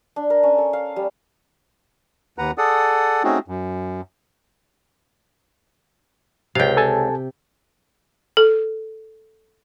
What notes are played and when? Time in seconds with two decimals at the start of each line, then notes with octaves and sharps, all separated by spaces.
0.16 D4
0.30 A#4
0.43 C#4
0.58 A4
0.73 F5
0.96 G3
2.38 D#2 B4 F#5 A#5
2.58 G#4 A4 D5 F#5 D#6
3.24 A3 C4 C#4 D#4 F#4 G#4
3.48 F#2
6.55 C#2 C3 F5 G5
6.77 A4 G#5 A5
8.37 A4